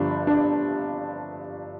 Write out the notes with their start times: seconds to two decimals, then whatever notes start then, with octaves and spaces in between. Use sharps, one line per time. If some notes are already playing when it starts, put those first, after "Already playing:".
Already playing: G1 G2 F3 D4
0.27 D4